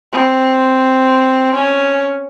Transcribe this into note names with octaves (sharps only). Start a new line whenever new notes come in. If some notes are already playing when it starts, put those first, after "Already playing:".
C4
C#4